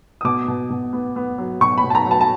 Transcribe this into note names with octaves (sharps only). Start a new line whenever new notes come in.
D#6
B2 D6
B2
B2
B3
B3
F#3
B2 C#6
B5
B2
A5
A#5
F#3 A5
A5